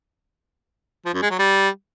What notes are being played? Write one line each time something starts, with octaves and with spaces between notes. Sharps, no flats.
F3
F#2
G#3
F#3
G3